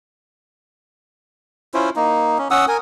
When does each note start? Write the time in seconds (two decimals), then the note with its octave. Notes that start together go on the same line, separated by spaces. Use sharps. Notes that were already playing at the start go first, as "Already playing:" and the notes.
1.74 C#4 E4 F4 C5
1.96 A#3 D#4
2.38 C#4
2.51 C#4 F#5 D#6 E6
2.68 A#4 G#5